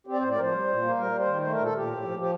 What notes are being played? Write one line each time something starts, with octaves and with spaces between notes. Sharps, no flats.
C4 G4
D5
A2 C5
D5
F3 A#4 C5
G3
A#2
A#3
G3 A#4
G3
C5
D#3
A3 C5
A#2 A#4
A4
A#2 G4
A2
F3
F3 G4